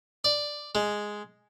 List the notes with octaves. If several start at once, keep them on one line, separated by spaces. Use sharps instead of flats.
D5
G#3